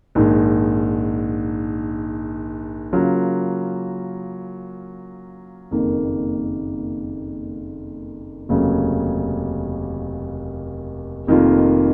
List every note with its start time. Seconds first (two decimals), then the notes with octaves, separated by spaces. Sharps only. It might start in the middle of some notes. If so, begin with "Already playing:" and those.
0.15 A#1 G#2 D#3
2.93 C#3 F#3 A#3 F4 A#4
5.71 F#1 F2 D#3 A#3
8.49 F1 D#2 C#3 F#3
11.27 F1 F2 D#3 A#3 F4